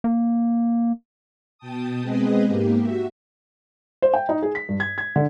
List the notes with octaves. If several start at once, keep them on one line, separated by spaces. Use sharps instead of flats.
A#3
B2 G5 A5 D#6
G#3 B3 C4 G#4 B4 D#5
G#2 A#3 G4
F#4 E5
C5
G5
D#4
G#4
B6
G2
G#6
G#6
D3